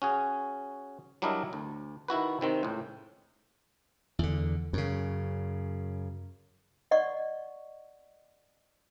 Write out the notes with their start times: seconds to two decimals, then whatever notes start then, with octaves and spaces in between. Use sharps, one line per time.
0.02 C#4 F#4 G#4
1.22 F#3 G3 D4 E4 A#4 D#5
1.53 D2
2.08 D#3 E4 F#4 B4
2.41 C3 D#3 C4
2.63 C#2 A2
4.19 E2 D3
4.73 F#2 C#3
6.91 D5 D#5 F#5 C#6